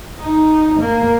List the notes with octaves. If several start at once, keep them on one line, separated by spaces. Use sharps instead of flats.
D#4
A#3